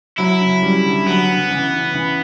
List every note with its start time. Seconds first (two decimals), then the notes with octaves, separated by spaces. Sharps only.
0.18 F#3 E4
0.40 C#3
0.63 G3
0.84 D3
1.06 F#3 B3
1.29 C#3
1.50 E3
1.73 C#3
1.95 E3